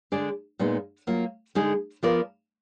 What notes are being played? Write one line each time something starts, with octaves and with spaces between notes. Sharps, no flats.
D3 G#3 D4 G#4 D5
A#2 G#3 B3 D#4
F#3 A#3 F4
D3 G#3 D#4 G#4
F3 B3 F4 A#4 D5